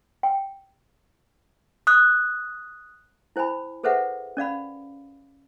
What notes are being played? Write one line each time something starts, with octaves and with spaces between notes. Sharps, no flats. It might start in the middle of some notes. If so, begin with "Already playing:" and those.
G5
D#6 F#6
E4 C5 G5 G#5 B5
G#4 A4 B4 C5 E5 F#5
C#4 D5 F5 B5